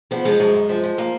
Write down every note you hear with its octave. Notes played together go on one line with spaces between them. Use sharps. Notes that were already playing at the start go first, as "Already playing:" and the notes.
F3 B3
F3 G#3
F#2 G#3
F#2
F3
F3
A#3